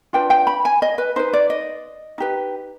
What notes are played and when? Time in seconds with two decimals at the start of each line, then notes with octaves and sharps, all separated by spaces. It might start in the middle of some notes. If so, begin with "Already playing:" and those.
0.13 D4 F4 B4 G5
0.30 G5
0.47 B5
0.65 G#5
0.82 D#5
0.98 B4
1.16 D#4 B4 C5
1.33 D5
1.50 D#5
2.18 D#4 G4 B4